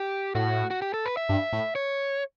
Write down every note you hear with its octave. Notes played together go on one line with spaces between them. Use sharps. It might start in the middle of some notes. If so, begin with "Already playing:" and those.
Already playing: G4
A2 F#4
F#4
G4
A4
B4
E5
G2
A2
C#5